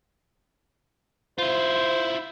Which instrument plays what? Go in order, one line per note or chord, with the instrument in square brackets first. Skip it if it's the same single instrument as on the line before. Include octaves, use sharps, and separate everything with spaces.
[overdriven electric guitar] E4 F4 [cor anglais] C5